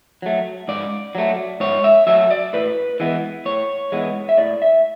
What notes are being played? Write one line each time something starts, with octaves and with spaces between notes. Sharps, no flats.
F#3 A3
G#2 D5
F#3 A3
G#2 C#5
E5
F#3 A3 E5
D5
A2 B4
E3 G#3 B3
A2 C#5
E3 G#3 B3
E5
A2 D5
E5